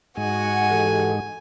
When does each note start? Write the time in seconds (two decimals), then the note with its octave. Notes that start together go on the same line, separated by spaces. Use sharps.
0.17 G#2 G#3 F#4 F#5 G#5
0.69 E3 G4 A4